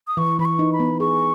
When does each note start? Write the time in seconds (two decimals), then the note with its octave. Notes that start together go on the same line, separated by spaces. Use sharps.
0.07 D#6
0.17 E3 C#6
0.39 E3 B5
0.45 C#6
0.59 D#4
0.72 B5
0.80 B3
1.00 G#4 C#6